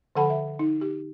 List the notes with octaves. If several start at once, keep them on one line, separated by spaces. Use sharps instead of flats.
D3 F3 A4 F#5 A5 B5
E5
D#4
G4